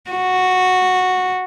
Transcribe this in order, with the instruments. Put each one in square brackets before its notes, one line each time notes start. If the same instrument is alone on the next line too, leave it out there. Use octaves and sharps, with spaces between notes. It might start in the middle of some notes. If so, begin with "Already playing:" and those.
[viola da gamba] F#4